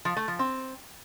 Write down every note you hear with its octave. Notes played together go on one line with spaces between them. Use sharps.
F3
A3
F3
C4